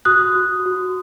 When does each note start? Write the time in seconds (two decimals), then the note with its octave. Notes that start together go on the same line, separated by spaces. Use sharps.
0.05 F#4 D#6 F#6
0.35 F#4
0.66 F#4